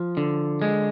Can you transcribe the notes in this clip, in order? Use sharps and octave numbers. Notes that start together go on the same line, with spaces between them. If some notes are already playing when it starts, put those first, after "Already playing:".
Already playing: F3
D3
G#3